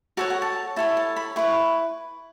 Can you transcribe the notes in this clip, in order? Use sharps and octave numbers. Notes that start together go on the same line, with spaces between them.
F#4 A4 C#5 A5
F#5
A5
E4 A4 C#5 A5
A5
B5
E4 B4 C#6